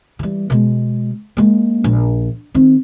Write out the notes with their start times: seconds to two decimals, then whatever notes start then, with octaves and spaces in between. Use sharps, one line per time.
0.19 E3 G3
0.50 B2 G#3
1.37 G#3 A#3
1.84 A#1
2.54 D#3 C4